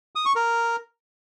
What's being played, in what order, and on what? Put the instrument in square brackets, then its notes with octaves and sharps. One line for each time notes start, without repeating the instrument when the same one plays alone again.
[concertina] D#6
C#6
A#4